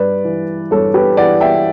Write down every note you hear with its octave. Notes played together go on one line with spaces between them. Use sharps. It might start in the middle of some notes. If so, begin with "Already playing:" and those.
Already playing: G2 B4 D5
E3
G2 A4 C#5
G4 B4
E3 D5 F#5
E5 G5